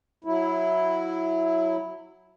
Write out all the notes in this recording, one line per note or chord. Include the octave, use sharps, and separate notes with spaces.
F#3 E4